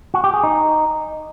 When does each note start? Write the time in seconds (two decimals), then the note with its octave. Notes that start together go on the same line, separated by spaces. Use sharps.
0.14 F#4
0.24 G4
0.34 G#4
0.43 D#4